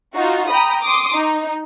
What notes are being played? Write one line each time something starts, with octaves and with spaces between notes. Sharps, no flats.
D#4 F4 F#4
G5 A#5 B5 D#6
C6 D6 D#6
D#4